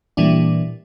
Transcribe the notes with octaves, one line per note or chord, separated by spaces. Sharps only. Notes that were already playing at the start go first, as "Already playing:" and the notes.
A#2 E3 G3 D4